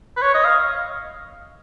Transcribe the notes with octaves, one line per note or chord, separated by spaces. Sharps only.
B4
C#5
D#5
F5